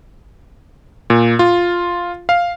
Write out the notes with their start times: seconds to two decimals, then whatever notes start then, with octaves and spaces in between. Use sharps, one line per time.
1.10 A#2
1.39 F4
2.29 F5